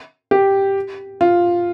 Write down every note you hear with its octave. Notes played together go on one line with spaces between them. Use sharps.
G4
F4